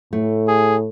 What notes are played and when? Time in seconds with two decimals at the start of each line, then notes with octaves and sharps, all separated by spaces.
0.13 A2 A3
0.48 G#4